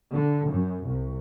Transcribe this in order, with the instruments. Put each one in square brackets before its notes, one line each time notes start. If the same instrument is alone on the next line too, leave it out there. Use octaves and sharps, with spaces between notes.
[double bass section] D3
F#2
C2